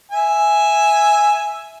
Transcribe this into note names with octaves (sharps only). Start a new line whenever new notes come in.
E5 G#5